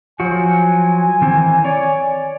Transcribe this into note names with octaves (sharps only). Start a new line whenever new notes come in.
F3 F#3 F#4 G#5
D#3 E3 C4
C#5 D5